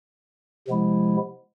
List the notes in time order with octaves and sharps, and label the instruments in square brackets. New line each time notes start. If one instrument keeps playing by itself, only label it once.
[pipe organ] C3 F3 G#3 B3 E4